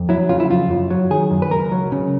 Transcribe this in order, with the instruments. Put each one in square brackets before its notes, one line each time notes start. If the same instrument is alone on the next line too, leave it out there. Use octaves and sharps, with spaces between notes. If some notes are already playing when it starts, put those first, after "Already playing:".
Already playing: [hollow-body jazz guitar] F2
F#3 E4
C#3 F4
E4
F2 F4
F#2
F#3
D#3 G#4
F#2
B4
C#2 A#4
F#3
C#3